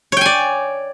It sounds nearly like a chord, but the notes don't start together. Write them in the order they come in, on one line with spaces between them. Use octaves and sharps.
C#5 G5 G#5 D5